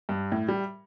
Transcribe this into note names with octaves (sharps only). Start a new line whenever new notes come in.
G2
A2
G3